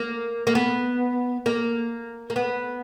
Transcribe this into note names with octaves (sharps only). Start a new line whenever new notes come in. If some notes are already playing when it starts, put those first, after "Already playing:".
Already playing: A#3
A#3
B3
A#3
A#3
B3